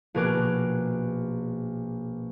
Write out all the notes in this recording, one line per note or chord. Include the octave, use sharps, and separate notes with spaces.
A#1 B2 G#4 A#4 D6 F#6